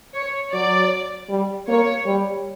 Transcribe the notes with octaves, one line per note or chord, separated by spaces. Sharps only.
C#5
F#3 D5
G3
A#3 C#5
G3